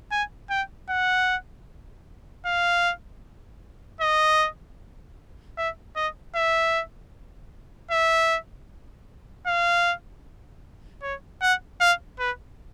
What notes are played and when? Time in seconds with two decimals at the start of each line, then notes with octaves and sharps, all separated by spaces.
0.12 G#5
0.50 G5
0.90 F#5
2.46 F5
4.01 D#5
5.58 E5
5.96 D#5
6.35 E5
7.91 E5
9.47 F5
11.03 C#5
11.42 F#5
11.81 F5
12.19 B4